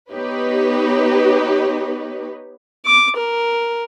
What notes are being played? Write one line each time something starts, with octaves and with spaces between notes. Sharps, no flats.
B3 D#4 G4 B4 C#5
D6
A#4